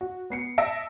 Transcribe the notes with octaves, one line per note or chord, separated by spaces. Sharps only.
F#4
B3 C7 C#7
D#5 E5 A5 E6 A#6 D7